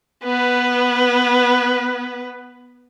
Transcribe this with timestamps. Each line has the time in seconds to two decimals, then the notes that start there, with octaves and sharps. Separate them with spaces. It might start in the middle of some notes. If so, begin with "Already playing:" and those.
0.24 B3 B4